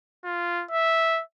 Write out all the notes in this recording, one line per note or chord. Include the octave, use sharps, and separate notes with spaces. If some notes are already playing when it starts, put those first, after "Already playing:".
F4
E5